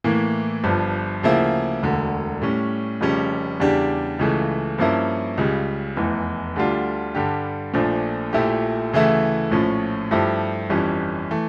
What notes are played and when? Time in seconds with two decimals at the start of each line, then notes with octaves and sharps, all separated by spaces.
0.04 A2 E3 A#3
0.64 G1 G2 F3
1.23 D2 C#3 F3 A#3 E4
1.82 E1 D2 D3
2.42 A2 G3 C#4
3.01 F1 F2 C#3 G3 C#4
3.60 E2 C#3 G3 D4 G4
4.19 C#2 C#3 E3 A3
4.78 G2 F3 A#3 C#4 E4
5.38 C#2 C#3 G3
5.97 F1 E2 E3
6.56 D2 D3 G3 D4 F4
7.15 G2 D3 G3 D4 G4
7.74 A#1 A#2 F3 A3 D4
8.33 A#1 A#2 A3 E4 G4
8.93 D2 C#3 E3 A3 E4
9.51 A#1 A2 F3 C#4
10.11 G2 F3 A3 E4 G4
10.69 G1 F2 E3 G3 C#4
11.31 E3 A3